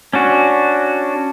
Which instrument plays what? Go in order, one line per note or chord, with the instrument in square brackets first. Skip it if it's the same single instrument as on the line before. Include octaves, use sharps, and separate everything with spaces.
[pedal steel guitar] C#4 D4 F#4